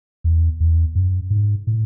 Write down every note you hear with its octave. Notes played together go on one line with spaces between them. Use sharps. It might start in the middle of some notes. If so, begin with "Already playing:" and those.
E2
E2
F#2
G#2
A2